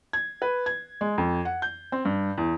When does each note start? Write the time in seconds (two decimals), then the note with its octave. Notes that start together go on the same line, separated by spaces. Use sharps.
0.13 G#6
0.42 B4
0.66 G#6
1.01 G#3
1.18 F2
1.45 F#5
1.62 G6
1.92 C4
2.05 G2
2.38 E2